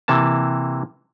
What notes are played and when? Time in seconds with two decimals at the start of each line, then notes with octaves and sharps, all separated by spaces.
0.08 C3 E3 A#3 A5